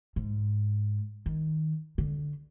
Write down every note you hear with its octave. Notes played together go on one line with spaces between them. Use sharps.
G#2
D#3
D3